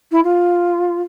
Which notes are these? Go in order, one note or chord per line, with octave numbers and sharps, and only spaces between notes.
E4
F4